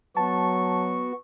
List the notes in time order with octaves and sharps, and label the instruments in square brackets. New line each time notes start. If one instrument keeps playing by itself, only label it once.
[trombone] F#3 [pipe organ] B3 F#4 [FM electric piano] A5 [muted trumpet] C#6